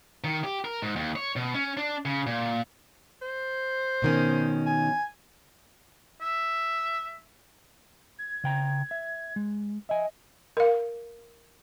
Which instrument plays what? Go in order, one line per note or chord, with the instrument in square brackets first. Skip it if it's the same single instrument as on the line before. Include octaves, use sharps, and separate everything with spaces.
[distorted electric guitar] D#3
G4
A#4
G#2
D#2
C#5
B2
C#4
D4
C#3
A#2
[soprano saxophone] C5
[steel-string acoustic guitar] B2 D#3 C#4
[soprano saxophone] G#5
[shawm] E5
[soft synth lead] G#6
[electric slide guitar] C#3 G5 A#5
E5
G#3
[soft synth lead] D#5 [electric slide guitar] E5 G#5
[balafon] A#4 F5